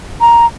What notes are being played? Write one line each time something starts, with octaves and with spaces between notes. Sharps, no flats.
A#5